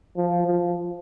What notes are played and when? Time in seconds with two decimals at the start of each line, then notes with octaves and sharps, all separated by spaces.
0.17 F3
0.47 F3